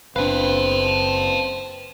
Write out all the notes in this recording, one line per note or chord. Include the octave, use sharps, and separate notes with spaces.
F#1 B2 C4 D4 B4 F5 A5